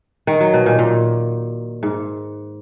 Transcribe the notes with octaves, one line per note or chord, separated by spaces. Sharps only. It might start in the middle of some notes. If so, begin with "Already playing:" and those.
D#3
F#3
B2
A#2
A#2
G#2